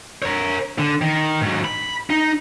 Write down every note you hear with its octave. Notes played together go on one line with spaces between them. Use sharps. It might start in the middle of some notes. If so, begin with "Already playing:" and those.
A#4 C#5
D3
D#3
G#2 F#3
B5
D#4